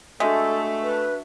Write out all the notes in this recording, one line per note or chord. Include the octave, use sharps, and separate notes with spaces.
G#3 A3 D4 F#4 A4 E5
B4